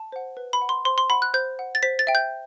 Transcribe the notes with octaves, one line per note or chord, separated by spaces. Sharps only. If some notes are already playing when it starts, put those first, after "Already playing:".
Already playing: A5
C5 F#5
B4
B5
F#5
C6
C5 C6
C6
F#5 B5
F#6
C5 G6
F#5
A6
C5 B6
A6
E5 G5
G6